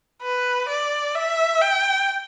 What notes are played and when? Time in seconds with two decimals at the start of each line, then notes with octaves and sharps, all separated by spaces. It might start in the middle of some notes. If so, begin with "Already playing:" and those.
0.23 B4
0.69 D5
1.15 E5
1.62 G5